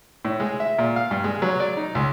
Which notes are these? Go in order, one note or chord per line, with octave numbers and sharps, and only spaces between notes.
A2
G#3
E5
A#2
F5
G2
G#3
F#3
D5
D#4
C#2